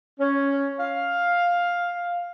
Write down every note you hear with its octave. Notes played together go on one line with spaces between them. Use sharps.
C#4
F5